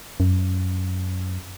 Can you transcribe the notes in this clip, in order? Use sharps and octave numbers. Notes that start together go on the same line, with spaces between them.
F#2